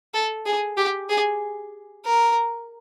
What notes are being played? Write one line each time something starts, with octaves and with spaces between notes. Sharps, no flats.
A4
G#4
G4
G#4
A#4